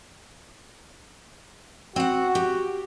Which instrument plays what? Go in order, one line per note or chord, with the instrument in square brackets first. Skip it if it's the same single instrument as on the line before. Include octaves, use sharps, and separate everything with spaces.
[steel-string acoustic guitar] C4 F#5 [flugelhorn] F#4
[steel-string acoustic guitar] G4